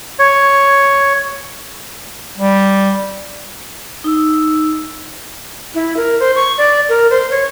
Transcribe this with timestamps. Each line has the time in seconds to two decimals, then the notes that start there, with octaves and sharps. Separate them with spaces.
0.19 C#5
2.38 G3
4.04 D#4 E6
5.75 E4
5.97 A#4
6.20 C5
6.36 C#6
6.58 D5
6.89 A#4
7.11 C5
7.30 C#5